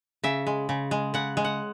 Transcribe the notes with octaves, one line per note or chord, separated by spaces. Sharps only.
C#3 E5
G#3
C#3
G#3
C#3 F#5
G#3
F#5